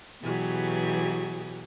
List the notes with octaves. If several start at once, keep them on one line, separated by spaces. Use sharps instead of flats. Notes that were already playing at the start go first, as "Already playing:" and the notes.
B2 E3 F#3 G4 G#4